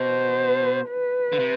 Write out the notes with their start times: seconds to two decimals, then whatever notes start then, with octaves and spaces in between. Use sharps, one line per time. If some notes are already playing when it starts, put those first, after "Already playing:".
Already playing: B2 C5
0.89 B4
1.33 D3
1.39 C3